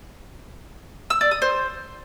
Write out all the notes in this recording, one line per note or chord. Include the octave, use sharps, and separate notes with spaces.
E6
D5
D#6
C5